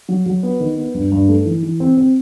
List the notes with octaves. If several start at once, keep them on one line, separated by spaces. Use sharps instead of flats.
F#3
F#3
B3
D#3
B3
G2
G2
A3
E3
E3
C4
C4